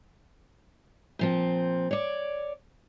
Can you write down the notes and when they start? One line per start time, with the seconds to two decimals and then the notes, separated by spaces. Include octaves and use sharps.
1.19 A#2 F3 C4
1.91 C#5 D5